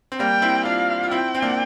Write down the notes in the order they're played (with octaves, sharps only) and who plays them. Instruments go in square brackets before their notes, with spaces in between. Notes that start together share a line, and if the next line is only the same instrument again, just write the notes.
[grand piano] C4
[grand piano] G3 A#3 [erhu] G5
[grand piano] C4 E4
[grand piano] D4 F4 [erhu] F5
[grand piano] F4
[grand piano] C4 E4 [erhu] G5
[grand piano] C4
A#3 D4